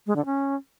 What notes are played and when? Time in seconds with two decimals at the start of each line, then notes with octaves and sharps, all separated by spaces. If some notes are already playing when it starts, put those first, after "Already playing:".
0.07 G#3
0.16 D3
0.26 C#4